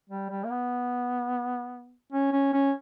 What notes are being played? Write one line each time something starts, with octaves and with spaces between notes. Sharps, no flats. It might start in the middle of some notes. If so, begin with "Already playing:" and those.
G3
G3
A#3
B3
C#4
C#4
C#4